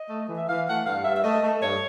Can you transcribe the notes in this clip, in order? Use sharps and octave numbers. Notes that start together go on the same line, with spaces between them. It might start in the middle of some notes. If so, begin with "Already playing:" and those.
Already playing: D#5
A3
E3
E5
E3 F5
A3 F#5
G2 F5
G2 E5
E5
A3 D#5
A3
G2 C#5